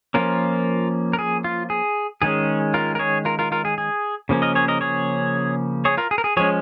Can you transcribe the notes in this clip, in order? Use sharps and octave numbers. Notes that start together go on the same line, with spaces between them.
F3 A#3 C#4 F4 A#4
A#4
G#4
F4
G#4
D#3 G#3 C#4 G#4
F4 A#4
A#4
G#4 C#5
F4 A#4
F4 A#4
F4 A#4
G#4
G#4
C#3 F3 A#3 C#4
A#4 D#5
G#4 C#5
A#4 D#5
G#4 C#5
G#4 C#5
F4 A#4
G#4
A#4
G#4
F3 G#3 C#4 G#4 C#5